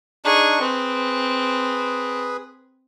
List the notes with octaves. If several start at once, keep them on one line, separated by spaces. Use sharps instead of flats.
D4 D#4 G#4 C#6
C4 G#4 B4